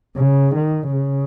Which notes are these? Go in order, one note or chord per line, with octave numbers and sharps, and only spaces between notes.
C#3
D#3
C#3